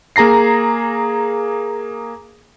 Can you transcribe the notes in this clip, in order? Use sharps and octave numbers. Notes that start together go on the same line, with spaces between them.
A#3 G#4 A#5 A#6 C7